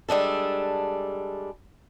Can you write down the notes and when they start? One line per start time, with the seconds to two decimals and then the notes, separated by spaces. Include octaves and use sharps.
0.09 G3 G#3 D4 A4